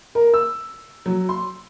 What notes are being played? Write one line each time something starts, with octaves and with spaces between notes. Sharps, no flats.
A#4
E6
F#3
C6